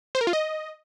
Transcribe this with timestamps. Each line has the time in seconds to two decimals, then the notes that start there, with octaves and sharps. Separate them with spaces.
0.15 C5
0.21 A#4
0.27 F4
0.33 D#5